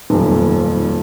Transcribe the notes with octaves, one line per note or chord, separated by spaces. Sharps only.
D#1 B1 F2